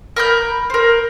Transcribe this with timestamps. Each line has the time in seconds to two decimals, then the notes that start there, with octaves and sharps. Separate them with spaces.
0.16 A#4 B5 G6
0.70 A#4 C5